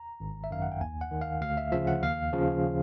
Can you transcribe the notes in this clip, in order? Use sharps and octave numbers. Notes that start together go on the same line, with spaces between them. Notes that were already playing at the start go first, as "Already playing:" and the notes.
Already playing: A#5
G#1
E5
F#2 D#3 F5
F#5
G5
D#2 G#5
F#5
D#3
F5
D2 F5
E5
C#3 F3 E5
F#5
D#2 F5
C#3 F3